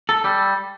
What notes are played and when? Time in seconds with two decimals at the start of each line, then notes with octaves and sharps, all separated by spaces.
0.09 A4
0.24 G3